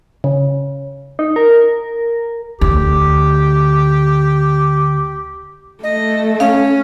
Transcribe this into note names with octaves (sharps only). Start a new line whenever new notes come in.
C#3
D#4
A#4
D2 G4
A3 D#5
C#4 F5